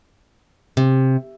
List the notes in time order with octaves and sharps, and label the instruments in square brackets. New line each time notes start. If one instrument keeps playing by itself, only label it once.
[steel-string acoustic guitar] C3